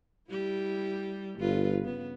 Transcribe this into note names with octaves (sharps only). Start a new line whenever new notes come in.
G3 E4 G4
G1 G2 F4 B4
C#3 B3